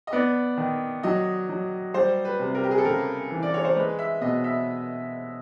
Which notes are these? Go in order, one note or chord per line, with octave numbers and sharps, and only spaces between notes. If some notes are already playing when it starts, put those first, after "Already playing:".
D#5
B3 D5
D#3
F#3 D#5
F#3
G3 C5
B4
C3
A#4
G4
G#4
A4
C#3 A#4
E3
D5
C#5
C5
G#3 B4
E5
B2 D#5
E5